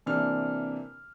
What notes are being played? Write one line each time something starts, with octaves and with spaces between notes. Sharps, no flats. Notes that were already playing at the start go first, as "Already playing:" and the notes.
C3 E3 A#3 D4 F6